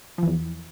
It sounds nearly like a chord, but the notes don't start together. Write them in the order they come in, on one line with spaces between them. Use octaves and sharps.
F3 E3 E2